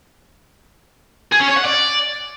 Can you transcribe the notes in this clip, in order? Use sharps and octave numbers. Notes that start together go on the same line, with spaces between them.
G#4
C#4
C#5
F#5
D5